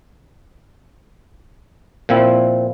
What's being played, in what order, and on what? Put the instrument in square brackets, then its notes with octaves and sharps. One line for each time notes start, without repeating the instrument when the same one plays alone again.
[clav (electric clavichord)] A#2 F3 C4 E4